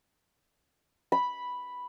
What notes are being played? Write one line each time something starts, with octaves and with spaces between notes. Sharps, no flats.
B5